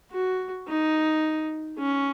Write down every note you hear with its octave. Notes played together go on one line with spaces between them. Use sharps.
F#4
D#4
C#4